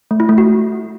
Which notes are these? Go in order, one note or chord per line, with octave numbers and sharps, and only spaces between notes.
A3
E4
A3
F#4